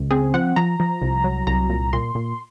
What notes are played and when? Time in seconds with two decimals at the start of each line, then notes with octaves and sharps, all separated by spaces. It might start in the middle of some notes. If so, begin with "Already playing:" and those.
Already playing: C#2
0.11 C4 G#4
0.34 F3 F#5
0.56 F3 A#5
0.80 F3
1.02 C2
1.24 F#3
1.47 C2 A#5
1.70 A#2
1.93 A#2 C6
2.15 A#2